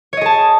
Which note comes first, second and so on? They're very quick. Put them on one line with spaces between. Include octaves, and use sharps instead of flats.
C#5 D#5 G#4 A5